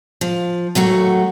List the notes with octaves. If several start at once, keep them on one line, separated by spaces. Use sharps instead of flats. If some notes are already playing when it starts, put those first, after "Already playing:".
F3
D#2 F#3 A3 F#4